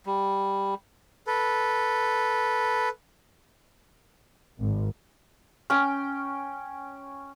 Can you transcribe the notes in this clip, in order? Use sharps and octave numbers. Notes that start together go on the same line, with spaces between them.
G3
A4 B4
G#1
C#4 G5